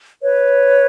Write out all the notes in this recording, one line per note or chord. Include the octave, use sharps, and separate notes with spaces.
B4 C#5